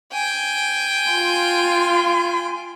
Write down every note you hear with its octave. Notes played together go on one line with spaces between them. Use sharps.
G5 G#5
F4 C6